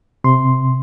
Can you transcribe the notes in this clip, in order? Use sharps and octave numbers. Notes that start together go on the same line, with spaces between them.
C3 C6